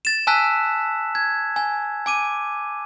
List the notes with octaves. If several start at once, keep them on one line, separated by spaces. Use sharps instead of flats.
A6 E7
G#5 A5 E6 F#6 B6
G#6
G#5
G#5 D6 D#7